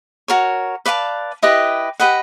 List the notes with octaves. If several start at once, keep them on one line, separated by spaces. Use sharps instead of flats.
F#4 A#4 C#5
B4 D5 F5 A5
E4 G4 B4 D#5
G4 B4 D#5 F#5